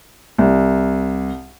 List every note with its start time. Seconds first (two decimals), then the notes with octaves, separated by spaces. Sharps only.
0.38 C2